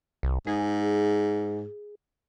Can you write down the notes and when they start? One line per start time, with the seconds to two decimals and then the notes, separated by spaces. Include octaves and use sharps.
0.23 C2
0.47 G#2 G#4